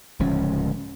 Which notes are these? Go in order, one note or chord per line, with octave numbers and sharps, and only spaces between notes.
D1 C#2 F3 C#4